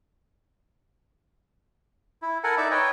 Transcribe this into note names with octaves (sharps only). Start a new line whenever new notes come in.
E4
A4 A#4 F#5 G#5
D#4 D5 E5
B4 C#5 D#5 G5 G#5